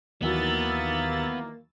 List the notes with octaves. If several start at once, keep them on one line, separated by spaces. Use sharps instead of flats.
D#2 D#3 E3 F#3 A#3 B3 E6 A6